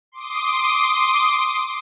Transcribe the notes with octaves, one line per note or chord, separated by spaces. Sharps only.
C6 D6 D#6